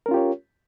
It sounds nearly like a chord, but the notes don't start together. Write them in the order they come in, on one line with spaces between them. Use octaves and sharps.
A#4 C#4 F4 G4 C#5